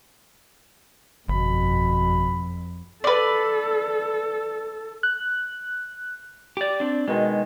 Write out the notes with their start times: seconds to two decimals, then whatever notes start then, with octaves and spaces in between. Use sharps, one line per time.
1.28 G1 F2 B2 B5
3.04 A4 B4 D5
5.03 F#6
6.57 G4 D5
6.80 C4 D4
7.08 B2 D#3 G#3